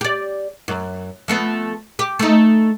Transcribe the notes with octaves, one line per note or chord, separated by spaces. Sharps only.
G4 D5
F#2
F3 A3 B3
G4
A3 D#4